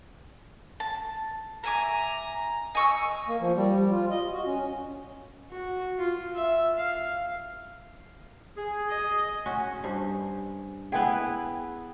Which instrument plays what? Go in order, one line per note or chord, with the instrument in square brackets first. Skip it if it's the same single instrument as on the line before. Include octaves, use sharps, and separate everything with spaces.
[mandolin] A5
[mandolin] E5 G#5 D6 [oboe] A#5
[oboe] D#5 [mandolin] G#5 C#6 E6
[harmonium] A#3
F3
G3
G3
F4
D#5
F#4
C#4
[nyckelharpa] F#4
F4
E5
F5
[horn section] G#4
[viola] D#5
[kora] C#4 F#4
[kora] G2 [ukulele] C5
[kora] B3 E4 G#4 [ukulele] F#5 G5